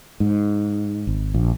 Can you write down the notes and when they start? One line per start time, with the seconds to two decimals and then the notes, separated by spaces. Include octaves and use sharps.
0.20 G#2
1.07 G#1
1.34 A#1